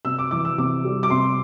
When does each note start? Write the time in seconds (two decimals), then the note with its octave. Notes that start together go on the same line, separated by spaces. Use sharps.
0.05 C3 E6
0.18 D6
0.31 E3 D6
0.45 E6
0.58 C3 D6
0.85 G3
1.03 D6
1.10 C3 C6